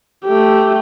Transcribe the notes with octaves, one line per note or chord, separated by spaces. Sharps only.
A3 G4